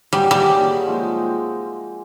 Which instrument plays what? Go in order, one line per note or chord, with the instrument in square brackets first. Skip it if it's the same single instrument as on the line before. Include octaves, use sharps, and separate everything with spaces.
[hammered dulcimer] F#3 A#3 D#4 G#4 [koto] G3
[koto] G3
[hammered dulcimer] F#3 A#3 D#4 G#4
C3 F3 G#3 C4